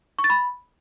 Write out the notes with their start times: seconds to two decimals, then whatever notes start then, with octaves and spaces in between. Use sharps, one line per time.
0.19 C#6
0.24 A6
0.30 B5